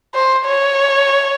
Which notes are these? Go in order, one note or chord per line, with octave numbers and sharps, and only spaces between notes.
C5
C#5